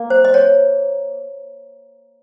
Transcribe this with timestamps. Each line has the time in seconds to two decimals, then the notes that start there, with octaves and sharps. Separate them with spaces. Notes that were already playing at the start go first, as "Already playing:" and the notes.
Already playing: A#3
0.10 C5
0.25 D#5
0.34 C#5